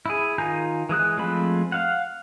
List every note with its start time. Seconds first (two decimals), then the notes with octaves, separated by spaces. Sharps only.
0.06 E4 G#4
0.38 D#3 F4 G#5 A#5 G6
0.89 E3 G#3 D#6 F#6
1.18 F3 G#3 A3 C4 B5
1.72 F5 F#5